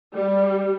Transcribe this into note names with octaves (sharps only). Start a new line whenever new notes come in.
G3